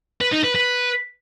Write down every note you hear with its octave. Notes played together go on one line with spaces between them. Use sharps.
B4
D#4
B4
B4